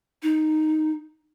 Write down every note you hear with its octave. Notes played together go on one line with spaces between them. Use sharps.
D#4